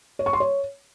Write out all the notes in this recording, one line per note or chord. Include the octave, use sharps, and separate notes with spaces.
C#5
C#6
C6
C#5